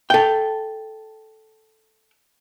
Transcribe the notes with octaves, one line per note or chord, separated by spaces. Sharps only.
A4 G5